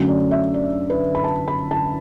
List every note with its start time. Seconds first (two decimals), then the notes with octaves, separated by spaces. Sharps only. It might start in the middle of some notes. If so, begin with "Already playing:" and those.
Already playing: F#2 D3 F#3 A3 C#4
0.08 D5
0.31 E5
0.54 D5
0.90 B4
1.15 B5
1.24 A5
1.48 B5
1.71 A5